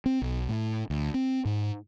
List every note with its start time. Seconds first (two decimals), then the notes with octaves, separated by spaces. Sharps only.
0.06 C4
0.22 B1
0.49 A2
0.90 D2
1.14 C4
1.45 G#2